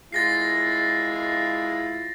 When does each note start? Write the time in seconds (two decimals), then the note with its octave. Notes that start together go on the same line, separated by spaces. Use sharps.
0.12 G#3 E4 F4 A6 A#6 C7